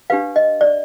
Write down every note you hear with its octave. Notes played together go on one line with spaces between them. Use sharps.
D4 G4 B4 F5
D#5
D5